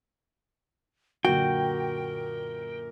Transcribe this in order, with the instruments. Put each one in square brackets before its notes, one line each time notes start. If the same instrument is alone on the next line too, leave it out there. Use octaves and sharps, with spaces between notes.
[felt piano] F#2 A#2 D3 [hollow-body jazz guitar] F#4 [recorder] A#4 [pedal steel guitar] G5